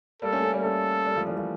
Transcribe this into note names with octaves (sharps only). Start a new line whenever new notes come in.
G3 A#3 A4
A3 C#4
A3 C#4
G3 A#3
A3 C#4 A4
G3 A#3
F3 A3
E3 G3
F3 A3